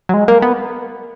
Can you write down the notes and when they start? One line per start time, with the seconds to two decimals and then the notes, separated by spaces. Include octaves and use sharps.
0.09 F#3
0.14 G#3
0.28 A#3
0.42 B3